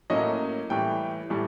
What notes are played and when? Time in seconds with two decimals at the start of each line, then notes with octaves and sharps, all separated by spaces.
0.10 A2 F#3 A#3 C#4 D#5
0.70 A2 E3 G3 G5
1.30 A2 E3 G3